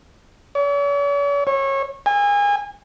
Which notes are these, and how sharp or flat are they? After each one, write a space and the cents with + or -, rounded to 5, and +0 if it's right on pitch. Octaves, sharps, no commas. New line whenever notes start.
C#5 +45
C#5 -25
G#5 -30